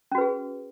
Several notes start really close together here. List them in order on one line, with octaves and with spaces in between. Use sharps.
C#4 F#4 B4 G#4